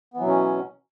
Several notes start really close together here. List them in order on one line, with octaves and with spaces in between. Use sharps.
B3 E3 F#3 B2 C#4